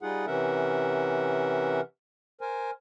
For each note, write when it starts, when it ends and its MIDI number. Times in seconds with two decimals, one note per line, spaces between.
0.02 0.26 55
0.02 0.26 63
0.02 0.26 65
0.02 0.26 68
0.02 0.26 78
0.27 1.81 48
0.27 1.81 52
0.27 1.81 61
0.27 1.81 70
0.27 1.81 76
0.27 1.81 78
2.41 2.71 70
2.41 2.71 72
2.41 2.71 80